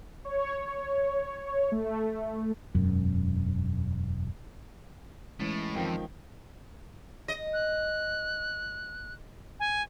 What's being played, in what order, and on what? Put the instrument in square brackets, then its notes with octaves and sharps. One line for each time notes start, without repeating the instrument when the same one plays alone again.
[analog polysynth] C#5
A3
[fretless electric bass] E1 F#2
[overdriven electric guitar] A2 [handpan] E3 G#3 C#4
[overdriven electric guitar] F2 [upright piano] D#3 F3 G5
[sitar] D#5
[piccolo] F#6
G#5